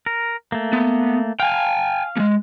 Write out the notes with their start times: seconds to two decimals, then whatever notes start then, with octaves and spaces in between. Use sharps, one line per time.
0.06 A#4
0.52 A3 A#3
0.73 B3
1.40 F5 G5 G#5
2.17 G#3 A#3